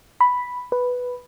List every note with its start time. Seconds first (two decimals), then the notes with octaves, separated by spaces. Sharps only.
0.21 B5
0.72 B4